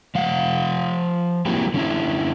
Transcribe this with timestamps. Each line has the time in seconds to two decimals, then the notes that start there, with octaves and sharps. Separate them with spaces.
0.15 F3 F5 F#5
1.46 G3 A#3 C4 E4 F#4 G4
1.74 D3 C#4 E4